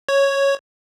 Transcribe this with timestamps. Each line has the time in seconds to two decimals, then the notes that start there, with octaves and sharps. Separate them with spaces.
0.09 C#5